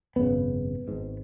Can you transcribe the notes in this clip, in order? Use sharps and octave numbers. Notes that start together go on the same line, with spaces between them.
G#1 F#2 C#3 B3
G#1 G#2